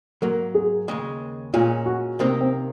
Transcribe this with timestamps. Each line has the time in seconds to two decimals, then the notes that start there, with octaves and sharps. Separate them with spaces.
0.22 G#2 F#3 A#3 A#4
0.55 G#4
0.88 D#2 C#3 G#3
1.54 A#2 G#3 C#4 F4
1.86 F#4
2.19 C2 C3 D#3 A#3 C4
2.41 C4